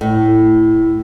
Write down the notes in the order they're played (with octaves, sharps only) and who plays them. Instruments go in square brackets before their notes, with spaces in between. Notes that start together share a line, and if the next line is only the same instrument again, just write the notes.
[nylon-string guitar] A2